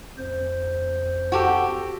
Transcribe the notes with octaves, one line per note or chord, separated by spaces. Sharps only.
F2 C5
F#4 G4 A4